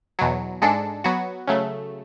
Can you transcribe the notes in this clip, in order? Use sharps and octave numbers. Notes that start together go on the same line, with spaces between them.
E2 B2 F#3
G#2 G#3 D4 A4
F#3 B3 F#4
C#3 F#3 A3